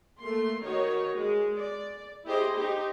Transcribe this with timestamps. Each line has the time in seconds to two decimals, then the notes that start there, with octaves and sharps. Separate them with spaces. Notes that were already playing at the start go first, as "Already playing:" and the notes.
0.20 A3 A#3 C6
0.61 D#3 D#4 F#4 A#4 C#5
1.15 G#3
1.56 D5
2.25 E4 G4 G#4 C5 D#5
2.54 D#4 G4 C5